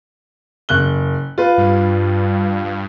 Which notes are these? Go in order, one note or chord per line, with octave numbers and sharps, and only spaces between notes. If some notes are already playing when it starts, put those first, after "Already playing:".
F#1 F#6 G7
F4 B4
G2
G2